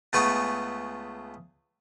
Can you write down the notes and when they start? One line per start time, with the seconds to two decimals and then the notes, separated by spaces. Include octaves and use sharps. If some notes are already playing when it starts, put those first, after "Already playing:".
0.13 C#2 A3 B3 G#4 B5 C#6